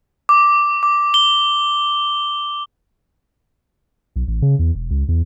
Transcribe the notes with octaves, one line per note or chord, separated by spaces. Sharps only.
D6
D6
G7
B1
A1
C#3
E2
E1
C#2
E2